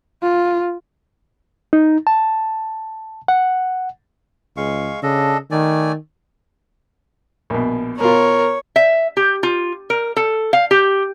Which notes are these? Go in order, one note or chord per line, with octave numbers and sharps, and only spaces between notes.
F4
D#4
A5
F#5
C#2 G#3 F5 C#6
C#3 D4 A4 D#5
D#3 A3 D5 G#5
A#1 B2
B2 F4 A#4 C#5
E5
G4
F4
A#4
A4
F5
G4